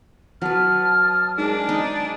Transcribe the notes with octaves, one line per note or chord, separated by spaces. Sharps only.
F#3 B4 A5 D#6 F6
G#2 D4 G#4 A#4
D#4 G#5